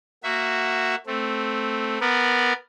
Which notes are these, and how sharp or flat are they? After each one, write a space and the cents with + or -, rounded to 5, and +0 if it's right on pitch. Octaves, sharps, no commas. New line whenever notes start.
A#3 -10 F#4 +0 E5 +10
A3 +0 C4 +0
B3 +0 A#4 +0 D5 +20